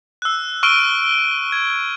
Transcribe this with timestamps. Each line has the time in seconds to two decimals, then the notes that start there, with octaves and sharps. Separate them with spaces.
0.22 E6 F#6
0.63 C#6 E6 F6 D7 D#7 G7
1.52 G#6